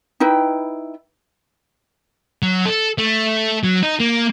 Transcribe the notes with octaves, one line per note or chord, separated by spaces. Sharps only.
D#4 E4 B4 G5
F#3
A4
A3
F#3
D#4
A#3